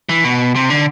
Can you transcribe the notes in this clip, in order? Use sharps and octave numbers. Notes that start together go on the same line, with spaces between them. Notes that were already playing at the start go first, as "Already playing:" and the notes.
E3
B2
C3
D3